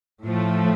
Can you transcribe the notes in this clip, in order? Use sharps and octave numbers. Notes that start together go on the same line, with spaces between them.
A2 F3 A3